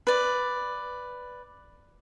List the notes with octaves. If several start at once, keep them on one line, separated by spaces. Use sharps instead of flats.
B4 D5